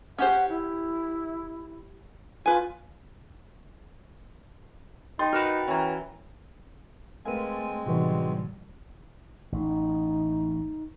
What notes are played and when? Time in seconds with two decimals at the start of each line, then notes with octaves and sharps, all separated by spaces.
0.18 C#4 G4 C5 F#5
0.49 E4
2.46 F4 B4 G#5
5.19 D#4 G5 C6 A6
5.33 F#4 A#4 B4 F6 E7
5.68 E3 C#4 A#5
7.25 G#3 A3 C4 A#4 B4 F5 G#5 D#7
7.86 A2 C3 E3 F#3 G3 B3 D#4 F#4
9.52 A1 D#4